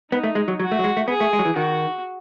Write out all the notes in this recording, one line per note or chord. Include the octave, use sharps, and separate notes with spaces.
B3 D#4
A3
G#3
F#3
F#3 F#4
A3
F#3
G#3
A3
B3 G#4
A3
G#3
F#3
E3
D#3 F#4